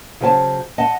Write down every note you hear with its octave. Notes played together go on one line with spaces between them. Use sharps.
C#3 F#3 C5 G#5 A5
D#5 F#5 A5